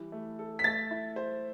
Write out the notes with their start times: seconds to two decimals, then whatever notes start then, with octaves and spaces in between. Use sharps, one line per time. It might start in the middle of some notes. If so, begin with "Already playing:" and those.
Already playing: E3 G3
0.12 A3
0.39 A4
0.59 B6
0.64 A3 A6
0.91 E4
1.16 C5